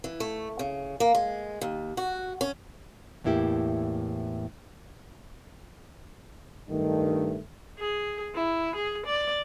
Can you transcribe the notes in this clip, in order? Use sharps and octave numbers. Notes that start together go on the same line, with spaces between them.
E3
A3
C#3
A#3
G#3
D#2
F#4
C#4
E2 A2 A#3 E4 G4
G2 D#3 A3
G#4
E4
G#4
D5